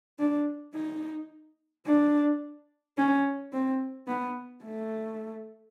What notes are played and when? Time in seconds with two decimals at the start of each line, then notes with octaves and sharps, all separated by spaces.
0.19 D4
0.74 D#4
1.86 D4
2.98 C#4
3.53 C4
4.08 B3
4.64 A3